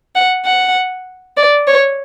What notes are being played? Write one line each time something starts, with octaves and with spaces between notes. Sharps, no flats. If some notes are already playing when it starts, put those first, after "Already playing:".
F#5
F#5
D5
C#5